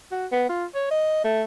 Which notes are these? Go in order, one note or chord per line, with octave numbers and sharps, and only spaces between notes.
F#4
B3
F4
C#5
D#5
A3